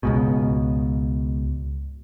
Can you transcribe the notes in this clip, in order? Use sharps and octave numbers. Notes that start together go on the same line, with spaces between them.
C#2 G#2 B2